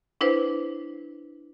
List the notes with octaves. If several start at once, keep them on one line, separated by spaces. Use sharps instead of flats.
D4 E4 B4 C5